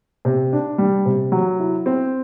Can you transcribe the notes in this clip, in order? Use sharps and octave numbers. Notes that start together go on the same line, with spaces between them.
C3
D4
G3
C3
F#3
E4
C4